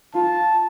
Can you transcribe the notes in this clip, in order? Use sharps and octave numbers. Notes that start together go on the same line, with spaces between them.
F4 A5